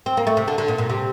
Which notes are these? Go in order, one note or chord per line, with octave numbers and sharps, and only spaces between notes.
C4
A#3
A3
C3
D3
D3
A#2
A#2
C3